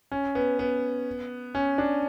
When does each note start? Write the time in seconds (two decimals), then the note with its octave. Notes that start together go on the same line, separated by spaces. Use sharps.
0.12 C#4
0.35 B3
0.59 B3
1.55 C#4
1.78 D4